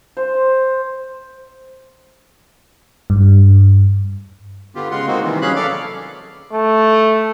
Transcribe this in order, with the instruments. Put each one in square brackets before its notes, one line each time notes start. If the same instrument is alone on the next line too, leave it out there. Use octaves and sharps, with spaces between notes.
[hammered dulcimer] C5
[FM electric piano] G2
[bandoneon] D3 B3 F4 G4
C#3 G#3 F4 F#5 C6
G#3 A#3 C4 D#4 F#4
C3 D#3 E3 G3
F#3 C#4 G#4 F5 B5 F#6
A4 D5 F5 D6 F6
[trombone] A3